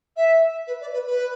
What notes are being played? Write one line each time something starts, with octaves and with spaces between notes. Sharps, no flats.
E5
B4
D5
B4
B4